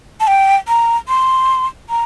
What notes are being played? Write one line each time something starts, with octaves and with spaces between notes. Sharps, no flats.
A5
G5
A#5
C6
A#5